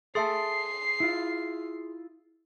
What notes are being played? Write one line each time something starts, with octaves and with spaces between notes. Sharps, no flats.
G#4 A4 E5 A5 C6 C7
E4 F4